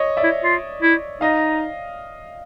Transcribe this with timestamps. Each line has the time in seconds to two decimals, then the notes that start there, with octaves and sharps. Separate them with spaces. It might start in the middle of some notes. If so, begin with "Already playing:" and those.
Already playing: C#5 D#5
0.17 D5 E5
0.23 E4
0.43 F4
0.82 E4
1.21 D#4 D#5 F5